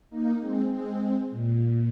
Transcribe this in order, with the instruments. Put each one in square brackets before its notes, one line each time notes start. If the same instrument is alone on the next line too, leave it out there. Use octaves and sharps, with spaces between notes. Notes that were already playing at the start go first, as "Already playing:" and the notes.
[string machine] A#3 D#4
G#3 C4
G#3 C4
A#2